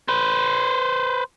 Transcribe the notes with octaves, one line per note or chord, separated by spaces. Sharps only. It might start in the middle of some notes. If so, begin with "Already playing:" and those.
B4 C5